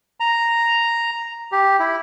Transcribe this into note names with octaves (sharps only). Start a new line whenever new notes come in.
A#5
G4
E4